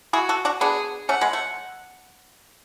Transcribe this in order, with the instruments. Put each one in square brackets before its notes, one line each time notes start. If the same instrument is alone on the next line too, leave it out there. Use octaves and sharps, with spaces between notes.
[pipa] E4 G#4 [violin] F#4
[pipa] F#4 A4
D4 F#4
[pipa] B3 D4 [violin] G#4
[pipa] A3 C#4 [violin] F#5
[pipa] G#3 B3
A3